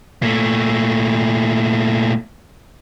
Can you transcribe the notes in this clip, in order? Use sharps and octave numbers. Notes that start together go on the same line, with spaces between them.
A#2 A3